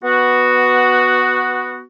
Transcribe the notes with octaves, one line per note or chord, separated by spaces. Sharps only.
B3 F#4